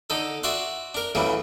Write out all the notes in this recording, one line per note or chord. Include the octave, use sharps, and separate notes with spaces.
D3 D#4 A4
F#4 D5 E5 F#5 C6
D4 A#4
A1 C#3 E3 F#3 G3